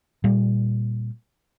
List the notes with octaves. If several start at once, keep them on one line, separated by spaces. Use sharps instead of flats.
A#2 G3